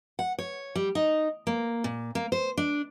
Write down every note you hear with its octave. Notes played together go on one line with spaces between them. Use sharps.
F#5
C#5
G3
D#4
A#3
A#2
A#3
C5
D4